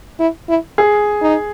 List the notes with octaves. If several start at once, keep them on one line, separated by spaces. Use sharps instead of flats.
E4
E4
G#4
D#4